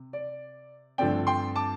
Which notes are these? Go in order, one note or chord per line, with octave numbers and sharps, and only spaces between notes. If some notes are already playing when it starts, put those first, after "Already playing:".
Already playing: C3
D5
G2 D3 F3 A3 C4 D5 G5
G5 C6
A5 D6